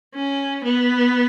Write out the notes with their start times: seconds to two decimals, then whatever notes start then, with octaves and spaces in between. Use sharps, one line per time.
0.15 C#4
0.64 B3